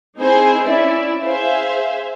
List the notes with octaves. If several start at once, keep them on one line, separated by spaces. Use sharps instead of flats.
C4 D#4 E4 G#4 C5
C#4 E4 D5 E5
G#4 C5 E5 F5